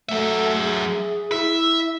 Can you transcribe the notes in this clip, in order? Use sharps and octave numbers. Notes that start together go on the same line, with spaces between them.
F#3 A3 E5
G#4
E4 E5